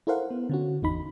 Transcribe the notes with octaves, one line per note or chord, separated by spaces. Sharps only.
E4 A4 A#4 C5 F5 F#5
B3
D3 C#4 F#4
G#1 E2 D#4 B5